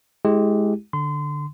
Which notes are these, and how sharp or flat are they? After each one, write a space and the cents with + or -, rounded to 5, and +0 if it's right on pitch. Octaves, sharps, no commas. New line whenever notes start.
G#3 +15 E4 -20 G4 +0
D3 +0 C6 -30